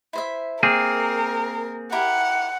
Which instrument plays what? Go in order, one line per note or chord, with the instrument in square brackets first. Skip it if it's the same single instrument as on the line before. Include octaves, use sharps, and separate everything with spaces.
[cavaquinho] E4 C5 E5
[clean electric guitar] A#3 C4 G#4 [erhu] A#4
[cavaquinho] E4 G4 A#4 [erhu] F#5